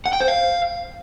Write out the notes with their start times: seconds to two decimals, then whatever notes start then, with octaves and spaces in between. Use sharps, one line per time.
0.06 F#5
0.13 G5
0.20 C5
0.28 F5